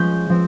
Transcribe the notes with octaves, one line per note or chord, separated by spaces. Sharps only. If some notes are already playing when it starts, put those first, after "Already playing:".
Already playing: F3 G#3 C#4 G6
F3 C4